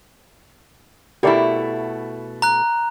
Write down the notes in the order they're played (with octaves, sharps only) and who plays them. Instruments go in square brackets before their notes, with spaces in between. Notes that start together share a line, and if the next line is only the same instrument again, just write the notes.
[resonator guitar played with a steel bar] B2 A3 E4 [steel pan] G4 A#4 D5
[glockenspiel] A#5 F#6